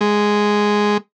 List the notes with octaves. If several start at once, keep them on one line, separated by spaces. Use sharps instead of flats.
G#3